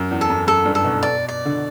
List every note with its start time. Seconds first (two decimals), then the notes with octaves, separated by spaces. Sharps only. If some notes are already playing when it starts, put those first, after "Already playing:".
Already playing: F#2
0.11 E2
0.21 A4
0.30 F#2
0.47 F#2 A4
0.65 G2
0.75 A4
0.84 B2
1.03 D5
1.28 D5
1.45 D3